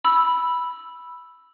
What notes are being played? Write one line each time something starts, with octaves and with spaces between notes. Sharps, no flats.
B5 E6